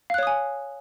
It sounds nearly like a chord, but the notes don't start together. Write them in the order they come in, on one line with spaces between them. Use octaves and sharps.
F5 F#6 C#5 D#6 G#5